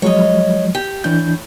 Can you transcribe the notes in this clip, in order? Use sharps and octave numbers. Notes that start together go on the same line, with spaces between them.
F3 F#3 G#3 C#5 D#5
G4
A2 E3 D4 G6